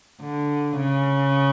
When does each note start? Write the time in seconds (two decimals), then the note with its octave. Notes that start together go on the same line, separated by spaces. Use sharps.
0.22 D3
0.76 C#3